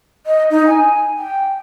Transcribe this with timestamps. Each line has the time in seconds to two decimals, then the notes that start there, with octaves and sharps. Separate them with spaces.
0.26 D#5
0.50 D#4
0.67 G#5
1.17 G5